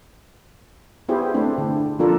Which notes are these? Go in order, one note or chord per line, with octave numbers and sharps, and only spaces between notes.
B3 E4 G4 G#4 C5
A3 C4 D4 E4
D3
F3 A#3 D4 F4 A4 A#4